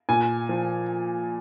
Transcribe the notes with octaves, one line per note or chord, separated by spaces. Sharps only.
A#2 G#5
F3